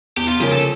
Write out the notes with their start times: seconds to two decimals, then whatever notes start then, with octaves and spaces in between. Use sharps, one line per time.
0.17 E2 G4
0.28 F4
0.40 C#3 F3 A#3 C#4 G4
0.51 A4